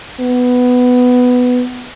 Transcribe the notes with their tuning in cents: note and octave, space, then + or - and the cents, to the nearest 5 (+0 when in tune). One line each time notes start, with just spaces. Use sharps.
B3 +5